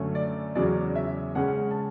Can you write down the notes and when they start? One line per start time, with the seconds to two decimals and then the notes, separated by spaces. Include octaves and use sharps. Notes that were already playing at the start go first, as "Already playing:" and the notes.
Already playing: F#2 D3 A3 C#4
0.15 D5
0.55 E2 C#3 F#3 C#4 D5
0.96 E5
1.35 C#3 G#3 C#4 F#5
1.71 A5